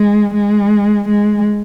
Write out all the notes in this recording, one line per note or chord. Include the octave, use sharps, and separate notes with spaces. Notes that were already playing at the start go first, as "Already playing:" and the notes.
Already playing: G#3
G#3
G#3